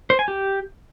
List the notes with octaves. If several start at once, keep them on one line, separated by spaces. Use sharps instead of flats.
C5
G#5
G4